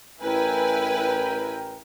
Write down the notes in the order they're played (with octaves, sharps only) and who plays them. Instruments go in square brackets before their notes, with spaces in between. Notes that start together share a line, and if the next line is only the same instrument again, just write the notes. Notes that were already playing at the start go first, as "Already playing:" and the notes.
[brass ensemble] A1 A#4 G5 [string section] E4 B4 G#5